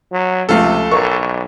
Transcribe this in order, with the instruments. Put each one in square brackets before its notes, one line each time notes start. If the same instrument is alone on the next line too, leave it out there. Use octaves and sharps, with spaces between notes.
[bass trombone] F#3
[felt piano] C#2 F3 A3 [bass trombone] C3 [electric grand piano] A4 F5
[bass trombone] B1 [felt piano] A#4 C#6